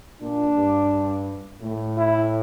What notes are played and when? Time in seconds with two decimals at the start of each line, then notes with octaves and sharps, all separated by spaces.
0.22 A#2 D4
0.56 G2
1.62 A2
1.98 E4